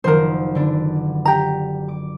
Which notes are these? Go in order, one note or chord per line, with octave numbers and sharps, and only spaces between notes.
F#1 D#3 F3 A#4 C5
D3 B3 D4
G4 A#5
D6